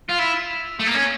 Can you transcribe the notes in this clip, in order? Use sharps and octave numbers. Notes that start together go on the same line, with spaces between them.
F4
E4
A3
A#3
C#4